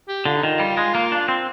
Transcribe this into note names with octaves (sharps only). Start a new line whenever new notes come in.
G4
D3 F4
D#4
D#3 F4
G3
G#3
A#3
D4
C4